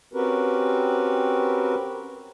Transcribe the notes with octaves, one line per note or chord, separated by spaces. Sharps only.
C4 C#4 F#4 G4 A#4 B4